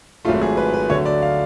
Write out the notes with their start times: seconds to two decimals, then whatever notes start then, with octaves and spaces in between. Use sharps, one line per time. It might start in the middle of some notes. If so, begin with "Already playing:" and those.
0.25 G#1 G#2 F#3 A3 F4
0.41 G#4
0.57 B4
0.74 B4
0.90 D2 D3 F#3 A3 C#5
1.06 D5
1.22 F5